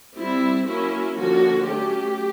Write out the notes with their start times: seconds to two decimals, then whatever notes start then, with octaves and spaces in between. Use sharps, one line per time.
0.15 G3 C4 E4
0.66 F#3 A#3 C#4 E4
1.16 D3 F3 A#3 C#4 F#4
1.66 F#3 A3 C#4 G4